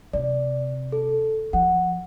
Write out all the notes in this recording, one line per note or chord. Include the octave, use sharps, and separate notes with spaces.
C3 D5
A4
F3 F#5